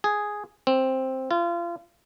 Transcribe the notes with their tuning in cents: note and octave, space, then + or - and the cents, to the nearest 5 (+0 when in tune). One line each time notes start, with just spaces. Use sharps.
G#4 +0
C4 +5
F4 -30